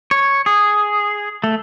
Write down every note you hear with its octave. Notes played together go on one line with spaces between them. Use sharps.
C#5
G#4
A3